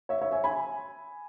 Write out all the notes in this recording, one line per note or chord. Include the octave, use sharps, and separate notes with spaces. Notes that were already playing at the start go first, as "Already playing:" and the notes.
C#5 E5
C#5 E5
E5 G#5
G#5 B5